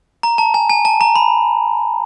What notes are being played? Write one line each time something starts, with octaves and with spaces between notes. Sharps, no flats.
A#5
A5
G#5
G#5
A5
A#5
B5